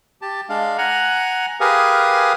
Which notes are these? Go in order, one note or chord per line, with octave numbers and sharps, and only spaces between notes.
G4 A5
G#3 D4 F5
F#5 G#5 A#5
G4 G#4 A#4 B4 F5 G#5